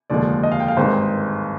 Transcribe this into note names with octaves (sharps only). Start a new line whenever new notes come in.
F1 D#2 D3 F3 G#3 D5
D#5
F5
G5
F5
G#1 G2 D#3 G#3 C5